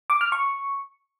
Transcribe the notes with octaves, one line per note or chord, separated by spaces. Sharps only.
D6
F6
C#6